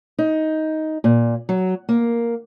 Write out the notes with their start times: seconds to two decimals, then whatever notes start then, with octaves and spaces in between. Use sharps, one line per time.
0.19 D#4
1.04 A#2
1.49 F#3
1.89 A#3